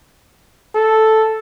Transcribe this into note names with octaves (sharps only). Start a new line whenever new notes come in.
A4